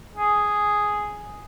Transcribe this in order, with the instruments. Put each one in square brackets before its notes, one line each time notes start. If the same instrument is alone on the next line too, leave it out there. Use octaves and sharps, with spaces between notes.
[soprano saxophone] G#4